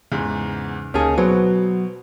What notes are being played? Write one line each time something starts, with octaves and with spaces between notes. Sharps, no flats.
E2 G#2 C#3
D2 A#3 C#4 D#4 G#4 A5
B2 F#3 F#4 B4 C5